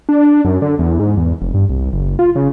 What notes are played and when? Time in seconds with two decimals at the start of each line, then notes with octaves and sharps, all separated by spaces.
0.09 D4
0.45 F#2
0.62 D3
0.79 E2
0.99 G#2
1.17 E2
1.42 F1
1.54 G2
1.70 C2
1.93 F#1
2.19 F4
2.36 C#3